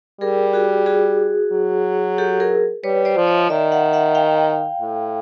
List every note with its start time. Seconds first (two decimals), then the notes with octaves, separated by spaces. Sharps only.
0.21 G3 G#4 A#4
0.53 F#4 G#4
0.86 F#4 G#4
1.52 F#3
2.18 G4 A4
2.40 G#4 A#4
2.84 G3 B4 C#5
3.05 C5 D5
3.17 F3
3.27 C#5 D#5
3.49 D#3 D5 E5
3.72 E5 F#5
3.93 E5 F#5
4.15 F5 G5
4.81 A2